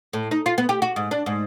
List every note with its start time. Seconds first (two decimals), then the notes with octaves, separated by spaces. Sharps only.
0.13 A2
0.31 D#4
0.46 F4
0.58 B3
0.69 G4
0.82 F#4
0.96 G#2
1.11 D4
1.26 G#2